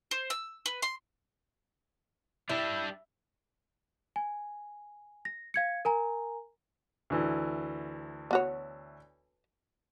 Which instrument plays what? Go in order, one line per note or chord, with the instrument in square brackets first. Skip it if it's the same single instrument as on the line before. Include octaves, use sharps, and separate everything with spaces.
[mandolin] C5
E6
B4
C6
[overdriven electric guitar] G3 D4 [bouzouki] E4
[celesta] G#5
A#6
F5 G#6 C#7
A#4 G#5 A#5
[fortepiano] D2 E3
[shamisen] B3 F#4 C#5